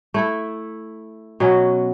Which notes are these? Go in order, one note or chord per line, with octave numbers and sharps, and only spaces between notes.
A3 E4 A4
B2 F#3 C#4 F#4